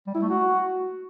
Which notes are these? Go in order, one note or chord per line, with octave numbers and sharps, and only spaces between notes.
G3
E4
A3
F#4